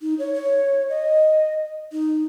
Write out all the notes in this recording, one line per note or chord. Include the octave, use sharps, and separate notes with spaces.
D#4
C#5
C#5
D#5
D#4